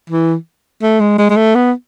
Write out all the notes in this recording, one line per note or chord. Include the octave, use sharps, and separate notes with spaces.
E3
A3
G#3
G#3
G#3
A3
B3